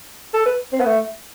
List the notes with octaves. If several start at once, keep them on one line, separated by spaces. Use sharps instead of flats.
A4
B4
C4
B3
A3